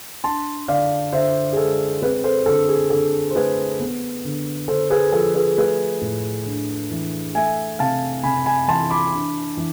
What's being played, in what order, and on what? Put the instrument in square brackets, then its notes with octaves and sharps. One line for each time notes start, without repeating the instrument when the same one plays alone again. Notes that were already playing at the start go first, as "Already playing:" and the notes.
[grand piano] D4 A5 C6
D3 D5 F5
D3 C5 E5
G#4
G#3 A4
C4 G#4 B4
A4 C5
D3 A4
G#4
D3 A4
C5
A3 G#4 B4
B3
D3
D3 A4 C5
G#4 B4
F3 A4
G#4 B4
A3 G#4 B4
A2
D4
E3
A3 E5 G#5
C3 F5 A5
C3 G#5 B5
G#5 B5
E3 A5 C6
B5 D6
D4
E3